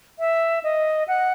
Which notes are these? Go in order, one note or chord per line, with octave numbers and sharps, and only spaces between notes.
E5
D#5
F#5